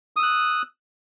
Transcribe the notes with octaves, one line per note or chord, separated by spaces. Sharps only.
D#6 E6 F#6